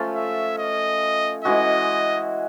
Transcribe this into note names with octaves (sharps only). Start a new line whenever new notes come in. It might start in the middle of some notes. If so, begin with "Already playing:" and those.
Already playing: F3 A3 C#4 F4
E5
D#5
E3 G#3 C#4 F#4 D#5